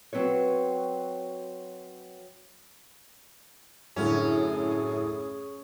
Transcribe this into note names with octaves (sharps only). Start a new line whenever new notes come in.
F#3 C4 B4 C#5
F#2 A2 D3 C#4 G#4